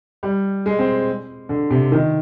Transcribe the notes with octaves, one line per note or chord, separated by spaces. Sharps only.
G3
G#3
C4
D3
C3
D#3